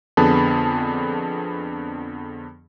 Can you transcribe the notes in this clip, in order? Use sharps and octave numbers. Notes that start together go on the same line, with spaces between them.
F2 D3 B3 G#4 A5 B5